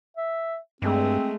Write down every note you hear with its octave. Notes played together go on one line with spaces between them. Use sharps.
E5
G2 G#3 A3 C4